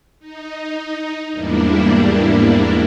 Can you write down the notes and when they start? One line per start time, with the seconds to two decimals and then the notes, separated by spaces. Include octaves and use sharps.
0.20 D#4
1.33 E2 G#2 G3 A#3 D4 E4